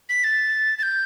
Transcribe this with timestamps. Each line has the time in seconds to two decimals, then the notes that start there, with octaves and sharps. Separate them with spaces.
0.09 B6
0.24 A6
0.78 A6
0.83 G6